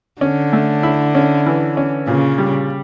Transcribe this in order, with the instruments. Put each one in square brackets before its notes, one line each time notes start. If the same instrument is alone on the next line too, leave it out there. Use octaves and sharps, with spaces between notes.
[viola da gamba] D3 [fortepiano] C#4
[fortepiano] A3
E4
C#4
E3
C#4
[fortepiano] A#2 [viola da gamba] C#3
[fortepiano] G3